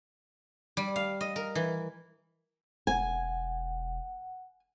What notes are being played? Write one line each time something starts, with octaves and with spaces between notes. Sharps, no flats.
G3
F5
D#5
A#4
E3
E1 F#5 G#5